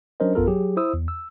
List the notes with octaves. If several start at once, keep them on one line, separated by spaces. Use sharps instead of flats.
F#3 C#4 D4 A#4 C5 D#5
A1 F#2 B3 F4 A4 A#4
F#3 G4 G#4
E4 C5 D#6 E6
E2
E6